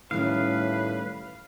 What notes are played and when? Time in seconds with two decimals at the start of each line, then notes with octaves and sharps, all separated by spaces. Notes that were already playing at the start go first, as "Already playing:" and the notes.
0.11 A2 D#3 G3 C#4 B4 F5